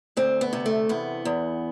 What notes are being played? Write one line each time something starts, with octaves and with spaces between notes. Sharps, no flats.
D2 C4
B3
C3
A3
E2 B3
E2